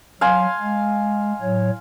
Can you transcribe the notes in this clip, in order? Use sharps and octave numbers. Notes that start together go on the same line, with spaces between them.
F#3 F5 G#5 C6
G#3
A2 F#3 C#5